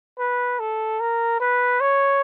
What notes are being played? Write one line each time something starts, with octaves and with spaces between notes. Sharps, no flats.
B4
A4
A#4
B4
C#5